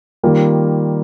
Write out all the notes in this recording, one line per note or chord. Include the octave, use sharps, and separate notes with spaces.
D#3 G3 A#3 F4